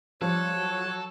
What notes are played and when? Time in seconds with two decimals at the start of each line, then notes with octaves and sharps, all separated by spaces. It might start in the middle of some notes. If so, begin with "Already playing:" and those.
0.21 F3 G3 A4 C#5 F#6
0.55 F#3